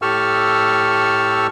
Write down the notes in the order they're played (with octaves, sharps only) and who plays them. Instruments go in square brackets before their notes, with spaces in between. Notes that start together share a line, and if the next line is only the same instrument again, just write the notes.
[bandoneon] A2 G4 A4 C#6 E6 F6